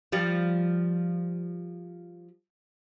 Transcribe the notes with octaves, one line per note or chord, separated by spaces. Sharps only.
F3 G3